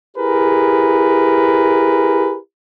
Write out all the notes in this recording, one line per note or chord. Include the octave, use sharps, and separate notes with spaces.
E4 G4 G#4 A#4 B4